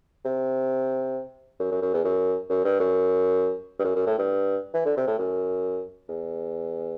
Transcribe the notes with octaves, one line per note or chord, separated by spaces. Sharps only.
C3
F#2
F#2
F#2
E2
F#2
F#2
G2
F#2
G2
F#2
F#2
A2
G2
E3
D3
C3
A2
F#2
E2